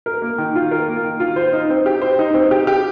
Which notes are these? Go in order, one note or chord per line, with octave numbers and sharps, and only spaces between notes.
A#4
A#3
D#3
F4
A#4
A#3
D#3
F4
C5
D#4
C4
G4
C5
D#4
C4
G4
G4